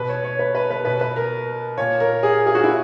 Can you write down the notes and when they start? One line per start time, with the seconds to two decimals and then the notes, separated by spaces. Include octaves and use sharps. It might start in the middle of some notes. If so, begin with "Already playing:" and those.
Already playing: B2 B4
0.09 C#5
0.24 C#5
0.39 B4
0.55 B4
0.70 B4
0.85 B2 B4
1.01 B4
1.16 A#4
1.77 A#2 C#5
2.00 A#4
2.23 G#4
2.47 G#4
2.55 F#4
2.64 E4